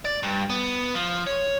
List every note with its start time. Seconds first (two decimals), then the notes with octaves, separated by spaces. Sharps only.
0.05 D5
0.23 G2
0.50 B3
0.95 F3
1.27 C#5